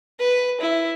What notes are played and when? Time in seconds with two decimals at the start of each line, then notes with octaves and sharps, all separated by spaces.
0.19 B4
0.60 E4